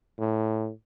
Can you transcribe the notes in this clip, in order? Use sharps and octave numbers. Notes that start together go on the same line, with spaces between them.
A2